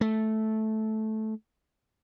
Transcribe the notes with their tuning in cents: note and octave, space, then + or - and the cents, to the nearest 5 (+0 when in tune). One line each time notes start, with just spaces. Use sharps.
A3 -10